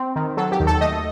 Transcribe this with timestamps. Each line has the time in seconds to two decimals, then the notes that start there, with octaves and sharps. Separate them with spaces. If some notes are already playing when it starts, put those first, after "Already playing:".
Already playing: C4
0.16 D#3
0.37 F#3 A4
0.52 G4
0.60 D#2
0.67 A4
0.81 A3 D#5